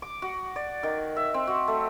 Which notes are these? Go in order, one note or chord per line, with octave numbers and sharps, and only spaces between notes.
D6
F#4
D5
D#3
E5
C4
F#4
A3